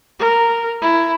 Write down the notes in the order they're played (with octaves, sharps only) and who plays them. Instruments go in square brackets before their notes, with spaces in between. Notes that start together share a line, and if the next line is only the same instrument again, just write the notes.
[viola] A#4
E4